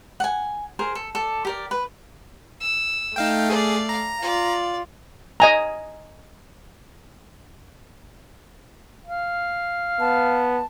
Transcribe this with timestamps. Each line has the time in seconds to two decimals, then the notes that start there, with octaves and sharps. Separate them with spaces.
0.20 F#5 G#5
0.79 G#4 A#4 C5
0.95 A4
1.15 A4 D5
1.45 G4 A#4 D5
1.71 B4
2.60 E6
3.16 A3 D#4 F5 G5
3.50 G#4 D5 F5
3.89 A#5
4.22 F4 D5
5.40 D#5 G#5 A#5
9.06 F5
10.00 B3 A5